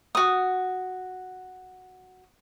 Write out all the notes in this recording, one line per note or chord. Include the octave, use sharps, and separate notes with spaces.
F#4 D#6